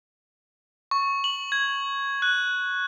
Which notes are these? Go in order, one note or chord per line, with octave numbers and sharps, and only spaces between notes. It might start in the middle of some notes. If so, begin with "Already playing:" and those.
C#6
F#7
G#6
F#6